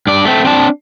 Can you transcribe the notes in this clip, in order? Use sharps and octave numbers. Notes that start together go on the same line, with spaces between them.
G2 D5
A3 C4
C4 D4 A5